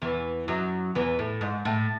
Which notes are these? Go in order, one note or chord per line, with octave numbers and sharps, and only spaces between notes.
E2 E3
F#2 F#3
E2 E3
A2
G#2
A2